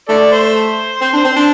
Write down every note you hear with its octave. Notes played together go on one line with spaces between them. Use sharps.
A3 A4 D5
C5
C4 C5
D4
C5
C4
D4 C5